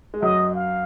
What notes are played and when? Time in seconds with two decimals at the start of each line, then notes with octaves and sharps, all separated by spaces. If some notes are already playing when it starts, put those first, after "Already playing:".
0.14 G#3
0.22 F#2 F#3 D#5
0.55 F5